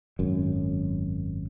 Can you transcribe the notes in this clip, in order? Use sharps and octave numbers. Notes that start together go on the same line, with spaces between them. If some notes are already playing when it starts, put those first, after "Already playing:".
G#1 F#2